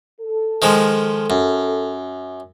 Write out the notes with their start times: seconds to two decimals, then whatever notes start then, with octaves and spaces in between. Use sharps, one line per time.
0.21 A4
0.62 D#3 F3 G#3
1.30 F#2